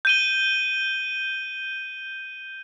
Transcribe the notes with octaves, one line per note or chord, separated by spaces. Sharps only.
G6 D#7 G7